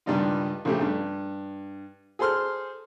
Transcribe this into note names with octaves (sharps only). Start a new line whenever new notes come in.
C#2 G2 D#3 G3 D#4 F4
A#1 C#3 A3 G4
G2
G#4 A4 C5 C6 F6